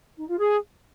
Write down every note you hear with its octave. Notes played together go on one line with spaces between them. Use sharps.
D#4
F4
G#4